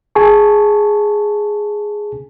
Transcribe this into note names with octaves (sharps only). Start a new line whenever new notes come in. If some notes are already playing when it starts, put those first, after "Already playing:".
G#4 G#5 A5 C#6